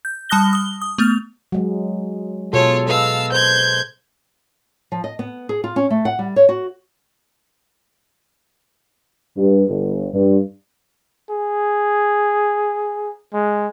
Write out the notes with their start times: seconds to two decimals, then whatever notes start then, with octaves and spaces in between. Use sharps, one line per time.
0.05 G6
0.29 G3 A5 D#6 F#6 A#6 G7
0.53 D#6 G7
0.81 D#6
0.98 A3 B3 F6 F7
1.52 F#3 G#3
2.53 B2 F4 G#4 A4 C#5
2.88 A4 B4 D#5 F5 E6
3.32 C5 G6 G#6
4.92 F3
5.04 D#5
5.19 B3
5.49 G#4
5.64 F4
5.76 C#4
5.90 A3
6.05 F#5
6.19 G3
6.36 C#5
6.49 F#4
9.37 G2
9.68 G1
10.14 G2
11.30 G#4
13.33 G#3